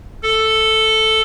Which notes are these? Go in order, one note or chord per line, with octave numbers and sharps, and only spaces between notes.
A4